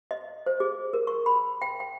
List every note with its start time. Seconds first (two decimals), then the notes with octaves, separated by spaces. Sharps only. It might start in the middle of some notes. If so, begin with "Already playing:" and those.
0.11 D#5
0.46 C5
0.60 G#4
0.93 A#4
1.07 C#6
1.26 B5
1.62 G5
1.80 G5